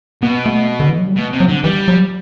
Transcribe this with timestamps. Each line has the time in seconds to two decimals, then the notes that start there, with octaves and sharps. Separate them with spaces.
0.22 B2 B3
0.46 A3
0.80 D3
0.89 E3
0.98 F#3
1.07 G3
1.16 B2 A3
1.33 C3
1.40 F#3
1.48 D3
1.63 E3 G3
1.88 F#3